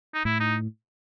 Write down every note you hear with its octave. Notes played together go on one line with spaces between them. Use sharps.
D#4
A2 E4
D#4